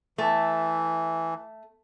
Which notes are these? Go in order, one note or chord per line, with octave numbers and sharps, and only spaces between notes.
E3 A3